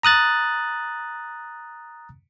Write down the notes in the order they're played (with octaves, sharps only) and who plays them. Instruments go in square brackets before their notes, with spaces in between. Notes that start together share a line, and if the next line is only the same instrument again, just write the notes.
[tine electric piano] A#5 D#6 F#6 A6